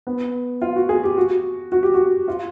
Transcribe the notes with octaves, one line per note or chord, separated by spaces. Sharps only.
B3
F4
F#4
G#4
G4
F#4
F#4
G4
F#4
F4